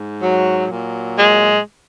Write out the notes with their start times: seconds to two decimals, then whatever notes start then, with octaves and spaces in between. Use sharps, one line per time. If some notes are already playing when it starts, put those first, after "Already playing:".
Already playing: G#2
0.22 F#3
0.69 A#2 F#3
1.15 G#3